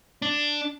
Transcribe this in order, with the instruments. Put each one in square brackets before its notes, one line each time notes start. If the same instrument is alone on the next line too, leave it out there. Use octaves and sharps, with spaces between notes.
[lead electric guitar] D4